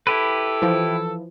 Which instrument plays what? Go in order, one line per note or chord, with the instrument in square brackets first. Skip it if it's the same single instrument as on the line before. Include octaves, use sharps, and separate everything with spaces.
[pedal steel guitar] E4 G4 B4 [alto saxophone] A4
[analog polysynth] E3 F3